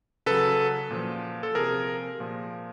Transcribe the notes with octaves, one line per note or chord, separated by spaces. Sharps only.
C#3 F#3 A4 B4
A#2 F3
A4
C3 F3 G#4 A#4
A#2 F3